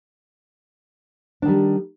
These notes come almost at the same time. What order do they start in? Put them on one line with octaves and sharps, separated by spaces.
D4 D#3 G3